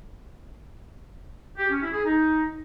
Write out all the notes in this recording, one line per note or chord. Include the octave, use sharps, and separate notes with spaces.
G4
C#4
E4
G#4
D#4